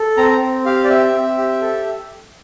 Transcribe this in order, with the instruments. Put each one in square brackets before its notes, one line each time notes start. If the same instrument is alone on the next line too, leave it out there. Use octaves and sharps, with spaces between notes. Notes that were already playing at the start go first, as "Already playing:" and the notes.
Already playing: [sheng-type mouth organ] A4
C4 A#5
C4
G4 F5
D5
C4 E5
C4
G4
A4